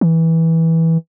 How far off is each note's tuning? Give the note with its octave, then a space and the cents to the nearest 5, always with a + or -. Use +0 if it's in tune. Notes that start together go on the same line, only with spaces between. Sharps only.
E3 -15